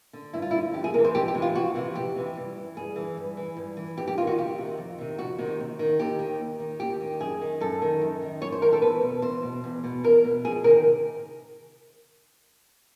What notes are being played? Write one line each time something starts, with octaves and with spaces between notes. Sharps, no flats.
D3
G2 E4
F4
D3 E4
F2 G4
G#4
C3 E3 A#4
C5
F2 G4
G4
C3 E3
F4
F2 F#4
C3 E3
F2 G4
C3 E3
G2
E3
G2 G#4
E3
G2
E3
G2
E3
F2 G4
G4
C3 D#3 F4
F#4
F2 G4
C3 D#3
F2
C3 D#3
F2 F#4
C3 D#3
D#2
D#3
D#2 G4
D#3
D#2
D#3
D#2 G4
D#3
F#2 G#4
D#3
F#2 A4
D#3
F#2
D#3
F#2 C#5
C5
D#3 A#4
A4
E2 B4
B2
E2 C5
B2
E2
B2
E2 A#4
B2
F2 G#4
C3 D#3 A#4